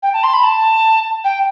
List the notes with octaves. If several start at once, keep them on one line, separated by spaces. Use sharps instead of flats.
G5
A5
C6
B5
A5
G5